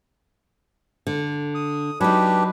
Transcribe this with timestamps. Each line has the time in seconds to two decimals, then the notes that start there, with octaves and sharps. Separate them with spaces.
1.07 D3
1.55 D#6
2.01 F#3 D4 D#4 G4 B4